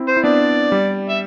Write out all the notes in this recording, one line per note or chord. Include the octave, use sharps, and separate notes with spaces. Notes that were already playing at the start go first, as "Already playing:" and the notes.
Already playing: C4 E4
C5
E4
B3 D4 D5
G3
E5